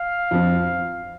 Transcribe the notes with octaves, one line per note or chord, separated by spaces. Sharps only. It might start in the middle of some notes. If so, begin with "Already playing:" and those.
Already playing: F5
F2 F3 C4